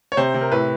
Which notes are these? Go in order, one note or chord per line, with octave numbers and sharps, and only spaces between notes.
C#5
C3 C5
C3
A#4
A2 B4